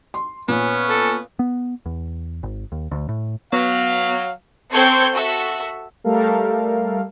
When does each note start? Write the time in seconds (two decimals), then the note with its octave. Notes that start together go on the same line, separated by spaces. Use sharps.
0.14 C6
0.48 A#2 B3 C#4
0.89 A4
1.39 B3
1.86 E2
2.43 G#1
2.72 D#2
2.91 D2
3.09 A2
3.53 F#3 B3 F5
4.71 C4 A4 C5 C#6 G6 G#6
5.14 F#4 A4 E5
6.04 G3 A3 A4 A#4 F5